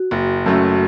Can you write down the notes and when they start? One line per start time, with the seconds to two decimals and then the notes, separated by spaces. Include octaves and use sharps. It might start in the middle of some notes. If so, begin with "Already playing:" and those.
Already playing: F#4
0.11 F#1
0.46 F#2 F#3 A3